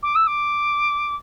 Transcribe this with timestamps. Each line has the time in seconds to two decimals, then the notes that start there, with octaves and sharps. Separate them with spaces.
0.03 D6
0.15 E6
0.27 D6